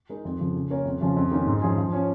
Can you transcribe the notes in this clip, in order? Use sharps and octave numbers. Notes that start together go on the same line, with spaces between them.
G#3 D#4 A#4
F2
C#3 F3
C#3
A#3 C#4 A#4 C#5
F2
C#3 F3 C#4 F4
F2
D#3 A#3 C#4
G#2
F3 C#4 G#4
F3
C#4 F4 C#5